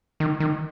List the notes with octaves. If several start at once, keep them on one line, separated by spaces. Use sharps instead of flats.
D#3
D#3